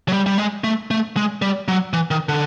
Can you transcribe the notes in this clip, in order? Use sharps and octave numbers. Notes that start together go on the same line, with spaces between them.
F#3
G3
G3
G#3
A3
A3
G#3
G3
F#3
E3
D#3
D3